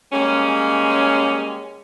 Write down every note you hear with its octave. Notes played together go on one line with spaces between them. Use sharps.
G3 G#3 A#3 C#4